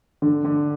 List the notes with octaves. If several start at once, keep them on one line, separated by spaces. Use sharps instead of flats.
D3
D3